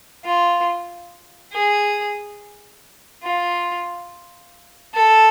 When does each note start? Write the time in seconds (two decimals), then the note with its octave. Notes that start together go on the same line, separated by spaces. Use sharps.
0.25 F4
1.52 G#4
3.23 F4
4.94 A4